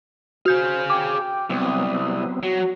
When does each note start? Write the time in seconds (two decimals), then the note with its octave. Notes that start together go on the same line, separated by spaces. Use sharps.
0.46 F#4 G#4 C5 F5 G6
0.90 G5 D6
1.50 C2 F#3 B3 C4 D#6
2.43 F#3 F#4